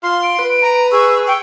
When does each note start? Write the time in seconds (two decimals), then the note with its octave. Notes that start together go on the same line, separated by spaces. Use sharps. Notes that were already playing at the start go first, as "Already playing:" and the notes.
0.03 F4 C6 F6
0.23 D7
0.39 B4
0.62 A#5
0.92 G#4 C#6 E6
1.27 G5 C#6